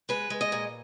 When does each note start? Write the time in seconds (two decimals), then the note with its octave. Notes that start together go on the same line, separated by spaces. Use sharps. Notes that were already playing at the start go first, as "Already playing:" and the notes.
0.09 G#3 B4
0.30 G#3
0.41 D#5
0.52 A#2